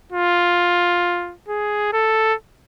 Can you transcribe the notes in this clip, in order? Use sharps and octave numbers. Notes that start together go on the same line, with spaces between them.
F4
G#4
A4